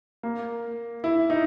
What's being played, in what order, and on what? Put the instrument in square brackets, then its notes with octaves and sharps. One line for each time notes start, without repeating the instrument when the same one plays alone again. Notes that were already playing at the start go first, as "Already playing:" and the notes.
[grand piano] A#3
E4
D#4